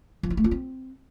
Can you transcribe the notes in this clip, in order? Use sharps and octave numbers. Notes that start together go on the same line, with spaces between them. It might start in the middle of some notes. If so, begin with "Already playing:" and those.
F3
E4
A3
F4
C4